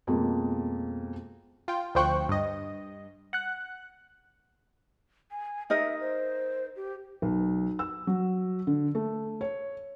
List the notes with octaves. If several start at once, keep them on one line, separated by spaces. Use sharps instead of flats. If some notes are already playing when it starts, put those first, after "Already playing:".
F2 B2 G#3 A#3
F4 G5
D2 F3 C5 G5 C#6 F#6
G2 D#5
F#5 F#6
G#5
D#4 A#4 D#5 E5
C5
G4
B1
E6
F#3
D3
A3
C#5